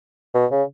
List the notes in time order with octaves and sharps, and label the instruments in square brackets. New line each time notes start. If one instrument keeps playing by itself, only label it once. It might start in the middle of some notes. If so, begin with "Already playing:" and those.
[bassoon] B2
C#3